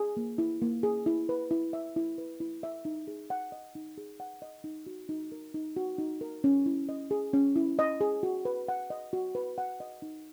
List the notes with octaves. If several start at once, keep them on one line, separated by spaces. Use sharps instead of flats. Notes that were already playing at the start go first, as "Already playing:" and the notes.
Already playing: G#4
A#3
E4
A#3
G#4
E4
B4
E4
E5
E4
B4
E4
E5
D#4
G#4
F#5
D#5
D#4
G#4
F#5
D#5
D#4
F#4
D#4
A#4
D#4
F#4
D#4
A#4
C#4
E4
D#5
G#4
C#4
E4
D#5
G#4
F#4
B4
F#5
D#5
F#4
B4
F#5
D#5
D#4